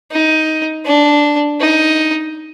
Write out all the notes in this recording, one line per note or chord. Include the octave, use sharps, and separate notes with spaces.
D#4
D4
D#4